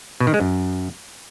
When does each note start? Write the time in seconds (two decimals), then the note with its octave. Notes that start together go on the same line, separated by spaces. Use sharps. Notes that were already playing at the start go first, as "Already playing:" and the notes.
0.20 B2
0.27 D#3
0.34 G#3
0.40 F#2